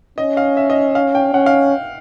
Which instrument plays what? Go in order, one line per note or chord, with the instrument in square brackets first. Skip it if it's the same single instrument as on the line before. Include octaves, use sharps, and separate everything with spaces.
[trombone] C#4 [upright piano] D#5
[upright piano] F5
E5
D#5
F5
G5
[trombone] C#4 [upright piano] F#5
[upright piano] F5